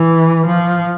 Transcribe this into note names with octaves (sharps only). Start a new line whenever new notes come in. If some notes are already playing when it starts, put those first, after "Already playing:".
Already playing: E3
F3